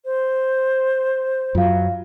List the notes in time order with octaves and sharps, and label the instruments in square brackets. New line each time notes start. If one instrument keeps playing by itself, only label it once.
[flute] C5
[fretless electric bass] F#2 F#3 [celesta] F4 F5